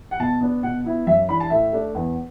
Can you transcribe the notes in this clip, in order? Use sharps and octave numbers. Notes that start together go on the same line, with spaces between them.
F#5
B2 A5
B3 D4
B2 F#5
B3 E4
F#2 E5
E3 D4 B5
A5
A2 E5
A3 D4
E2